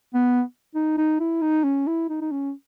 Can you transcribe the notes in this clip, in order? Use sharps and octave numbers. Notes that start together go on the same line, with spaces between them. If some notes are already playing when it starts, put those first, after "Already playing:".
B3
D#4
D#4
E4
D#4
C#4
E4
D#4
D#4
C#4